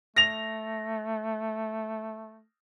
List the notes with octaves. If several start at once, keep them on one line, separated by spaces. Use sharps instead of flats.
A3 A#6 F7